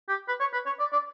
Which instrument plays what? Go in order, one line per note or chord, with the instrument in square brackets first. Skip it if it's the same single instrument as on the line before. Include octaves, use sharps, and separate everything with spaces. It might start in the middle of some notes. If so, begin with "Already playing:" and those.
[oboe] G4
B4
C#5
B4
C#5
D5
D5